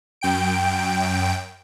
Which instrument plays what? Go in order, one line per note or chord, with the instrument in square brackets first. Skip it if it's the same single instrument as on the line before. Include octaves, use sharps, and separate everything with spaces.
[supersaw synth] F#2 G5 D7